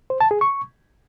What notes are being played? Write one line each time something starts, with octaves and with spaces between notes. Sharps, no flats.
C5
A5
G#4
C#6